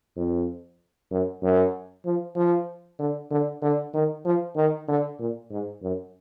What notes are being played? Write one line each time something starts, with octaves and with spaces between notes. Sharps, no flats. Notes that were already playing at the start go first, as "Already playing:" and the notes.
F2
F#2
F#2
F3
F3
D3
D3
D3
D#3
F3
D#3
D3
A#2
G#2
F#2